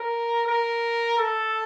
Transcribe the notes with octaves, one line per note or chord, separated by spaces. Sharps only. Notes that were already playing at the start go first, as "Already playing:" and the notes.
Already playing: A#4
A#4
A4